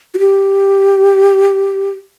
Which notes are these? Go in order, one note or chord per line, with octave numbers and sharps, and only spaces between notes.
F#4
G4